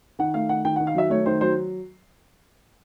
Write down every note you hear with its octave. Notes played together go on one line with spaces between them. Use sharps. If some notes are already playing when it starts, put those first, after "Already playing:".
D#3 F#5
A3 F5
D#3 F#5
D#3 G5
F#5
D#3
F5
F#3 E5
A3 C#5
D#3 C5
F#3 C5